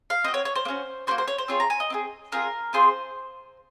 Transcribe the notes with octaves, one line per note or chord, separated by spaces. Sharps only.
F5
C4 F#4 D#5
C#5
C#5
C5
A#3
C#4 F#4
A#3 C#4 F#4 C5
C5
C#5
C5
C4 F4 G#4 C#5
A#5
G#5
D#5
C4 F4 G#4
C4 F4 G#4 A#4
C4 F4 G#4 C5